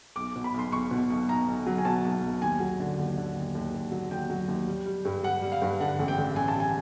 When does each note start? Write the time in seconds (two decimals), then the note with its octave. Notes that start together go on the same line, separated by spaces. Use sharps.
0.16 B1 D6
0.36 B2
0.44 B5
0.54 B1
0.59 C6
0.72 B1 C#6
0.91 B2
1.10 B1
1.29 B1 A#5
1.48 B1
1.66 F#3
1.78 G#5
1.85 B2 A5
2.04 B1
2.22 B1
2.42 D#2 G#5
2.60 F#3
2.80 D3
2.98 D#2
3.18 D3
3.35 D#2
3.55 D#2
3.74 D#2
3.92 F#3
4.11 D#2 G5
4.30 F#3
4.48 D#2
4.68 G3
4.86 G3
5.05 G2
5.23 G3 F#5
5.42 G3
5.52 F5
5.62 G2
5.80 D3 F#5
5.99 A1
6.08 G5
6.18 A1
6.36 A1 G#5
6.48 A5
6.55 G3 G#5